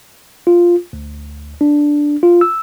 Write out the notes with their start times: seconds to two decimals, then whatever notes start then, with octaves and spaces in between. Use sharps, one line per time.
0.47 F4
0.93 D2
1.61 D4
2.23 F4
2.41 E6